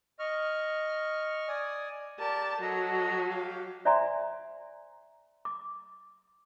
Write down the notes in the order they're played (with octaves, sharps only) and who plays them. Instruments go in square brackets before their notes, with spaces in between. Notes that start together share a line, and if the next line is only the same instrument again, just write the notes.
[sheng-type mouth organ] D#5 C#6 F6
D5 G#5 D#6
[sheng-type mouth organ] G4 A#4 D5 [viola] A5
[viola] F#3 [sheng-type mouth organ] A4 D#5 A#5
[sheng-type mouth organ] G4 F5
[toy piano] C5 D5 E5 G#5 A#5 C6
D6